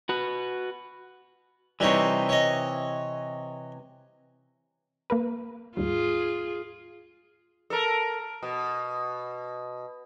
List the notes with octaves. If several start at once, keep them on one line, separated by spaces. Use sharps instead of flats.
F#4 B4
C3 E3 G3 D#4 C#5
C#5 D#5
A#3 A#4 B4
D#2 G#2 G3 F4 G#4
A4 A#4
B2